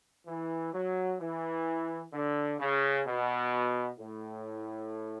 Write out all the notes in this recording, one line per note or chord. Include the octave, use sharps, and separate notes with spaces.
E3
F#3
E3
D3
C#3
B2
A2